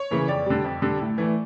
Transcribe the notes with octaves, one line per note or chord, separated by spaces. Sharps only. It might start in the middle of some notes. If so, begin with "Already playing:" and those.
Already playing: C#5
C#3 E3 A#3
F2 D5
D3 G3
F2
D3 G3
A2
E3 A3